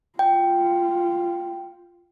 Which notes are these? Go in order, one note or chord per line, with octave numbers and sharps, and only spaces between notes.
F4 G5